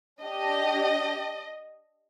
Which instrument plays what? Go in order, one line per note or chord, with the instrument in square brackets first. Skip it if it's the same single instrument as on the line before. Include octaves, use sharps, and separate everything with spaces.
[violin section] D4 G4 D#5